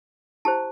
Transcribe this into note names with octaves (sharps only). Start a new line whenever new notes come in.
E4 G4 C5 A5